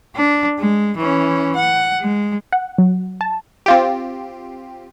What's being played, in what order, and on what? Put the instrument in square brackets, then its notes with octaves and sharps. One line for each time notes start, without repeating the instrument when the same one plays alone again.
[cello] D4
G#3
E3 C#4
F#5
G#3
[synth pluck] F#5
F#3
A5
[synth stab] C4 F4 G4